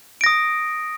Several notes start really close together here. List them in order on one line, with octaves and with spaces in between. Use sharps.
D7 A#6 D#6